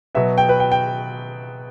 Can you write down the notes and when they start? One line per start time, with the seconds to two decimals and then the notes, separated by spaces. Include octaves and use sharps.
0.15 B2 F#3 B3 E5
0.38 G5
0.49 B4
0.60 G5
0.72 G5